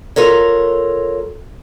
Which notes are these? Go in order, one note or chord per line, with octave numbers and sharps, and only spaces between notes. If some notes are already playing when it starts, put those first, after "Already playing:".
F4 A4 A#4 C#5